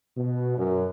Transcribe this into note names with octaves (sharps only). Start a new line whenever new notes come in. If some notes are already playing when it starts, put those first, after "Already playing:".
B2
F#2